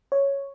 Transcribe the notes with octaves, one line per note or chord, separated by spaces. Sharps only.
C#5